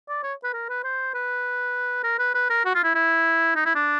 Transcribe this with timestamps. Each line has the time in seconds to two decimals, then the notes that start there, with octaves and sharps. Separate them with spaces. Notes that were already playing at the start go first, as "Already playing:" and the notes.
0.09 D5
0.23 C#5
0.44 B4
0.53 A#4
0.69 B4
0.84 C5
1.14 B4
2.03 A#4
2.19 B4
2.35 B4
2.50 A#4
2.65 F#4
2.75 F4
2.84 E4
2.95 E4
3.55 D#4
3.65 E4
3.75 D4